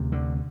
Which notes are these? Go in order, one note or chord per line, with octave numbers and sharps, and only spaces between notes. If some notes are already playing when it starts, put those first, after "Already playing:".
Already playing: D2 C3
D3